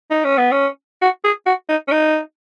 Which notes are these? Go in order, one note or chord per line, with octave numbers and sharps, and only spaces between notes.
D#4
C#4
B3
C#4
F#4
G#4
F#4
D#4
C#4
D#4